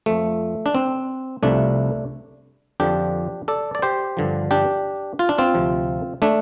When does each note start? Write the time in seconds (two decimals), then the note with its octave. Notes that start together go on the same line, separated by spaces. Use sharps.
0.06 F2 F3 A3
0.66 D4
0.75 C4
1.43 C2 C3 F3 A3 D4
2.80 F2 D3 F3 D4 G4
3.48 A4 D5
3.75 D5
3.82 G4 C5
4.17 G2 D3 F3
4.51 D4 G4
5.19 F4
5.29 D4
5.38 C4 F4
5.54 D2 C3 F3
6.22 A3 D4